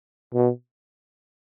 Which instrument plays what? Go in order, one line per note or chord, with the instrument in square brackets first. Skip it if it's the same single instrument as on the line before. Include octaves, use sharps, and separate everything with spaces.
[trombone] B2